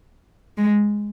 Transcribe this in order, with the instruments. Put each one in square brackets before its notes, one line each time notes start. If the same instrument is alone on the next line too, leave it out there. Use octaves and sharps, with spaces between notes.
[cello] G#3